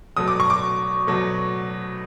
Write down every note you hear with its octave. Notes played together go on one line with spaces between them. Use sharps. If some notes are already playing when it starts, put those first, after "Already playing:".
B2 F#3 A3 D#6
D6
C#6
D6
B2 F#3 A3